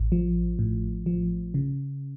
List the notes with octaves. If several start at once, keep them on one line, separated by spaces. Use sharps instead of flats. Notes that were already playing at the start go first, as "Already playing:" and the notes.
Already playing: A1
F3
A2
F3
C#3